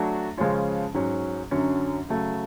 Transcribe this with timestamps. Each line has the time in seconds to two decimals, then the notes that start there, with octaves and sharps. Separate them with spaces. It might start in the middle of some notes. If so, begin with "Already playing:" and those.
Already playing: F#3 A3 D4 F#4
0.38 C#3 F3 G#3 C#4 F4
0.94 G#2 F#3 C#4
1.51 F#2 D3 F#3 C#4
2.09 C#3 F#3 A3